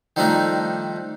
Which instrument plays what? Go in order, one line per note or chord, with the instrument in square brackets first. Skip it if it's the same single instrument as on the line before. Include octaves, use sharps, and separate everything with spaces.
[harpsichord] D#3 F3 G3 A3 D4 D#4